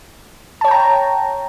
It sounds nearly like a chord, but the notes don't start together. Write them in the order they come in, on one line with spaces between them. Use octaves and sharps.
A5 C#5 G5 A#5